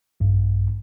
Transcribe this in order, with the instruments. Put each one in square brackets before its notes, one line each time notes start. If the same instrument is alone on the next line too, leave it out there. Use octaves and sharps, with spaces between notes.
[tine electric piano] A#1 G2